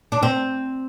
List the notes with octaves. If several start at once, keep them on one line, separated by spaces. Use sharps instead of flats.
D4
C4